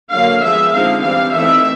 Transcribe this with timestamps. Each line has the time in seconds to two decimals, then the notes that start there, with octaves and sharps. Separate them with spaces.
0.12 D3 F#3 A#3 F5
0.43 F3 G#3 B3 E5
0.73 D3 F3 G#3 C4 D#4 F5
1.03 E3 G3 C4 F5
1.34 E3 A3 C4 D#4 E5